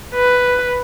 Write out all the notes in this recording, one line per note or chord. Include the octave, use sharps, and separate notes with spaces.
B4